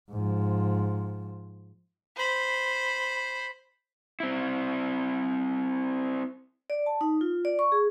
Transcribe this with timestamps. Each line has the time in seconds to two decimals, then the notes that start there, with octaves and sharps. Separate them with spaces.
0.11 G#2 F3
2.16 C5 B5
4.20 C4 E4
6.70 D5
6.86 A5
7.01 D#4
7.21 F4
7.45 D5
7.59 C#6
7.72 G#4